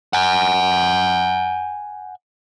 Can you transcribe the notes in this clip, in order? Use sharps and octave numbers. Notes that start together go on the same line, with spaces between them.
F#5 G#5